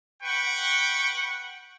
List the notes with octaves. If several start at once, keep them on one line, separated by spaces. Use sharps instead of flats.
B4 F#5 G5 C#6